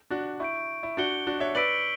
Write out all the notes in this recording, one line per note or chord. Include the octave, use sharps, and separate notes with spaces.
D4 F#4
E4 C#6 G6 D7
E4
D4 F#4 G6 C#7 G7
D4 F#4
C#5 E5
B4 D5 E6 B6 D7 F#7